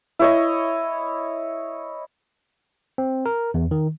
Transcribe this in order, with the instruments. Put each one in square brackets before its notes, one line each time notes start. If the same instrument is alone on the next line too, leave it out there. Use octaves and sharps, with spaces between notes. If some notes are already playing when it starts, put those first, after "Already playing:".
[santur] E4 C#5 D#5
[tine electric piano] C4
A#4
E2
D#3